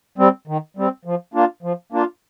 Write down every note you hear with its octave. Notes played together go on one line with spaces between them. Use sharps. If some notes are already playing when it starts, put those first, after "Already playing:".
G3 C4
D#3
G3 C4
F3
A#3 D4 F4
F3
A#3 D4 F4